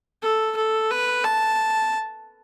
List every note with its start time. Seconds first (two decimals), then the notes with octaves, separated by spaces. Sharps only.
0.22 A4
0.56 A4
0.91 B4
1.24 A5